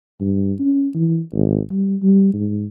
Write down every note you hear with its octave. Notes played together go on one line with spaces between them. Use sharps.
G2
C#4
E3
G#1
G3
G3
G#2